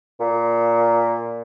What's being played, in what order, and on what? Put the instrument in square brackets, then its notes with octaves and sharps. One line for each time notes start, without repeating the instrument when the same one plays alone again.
[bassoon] A#2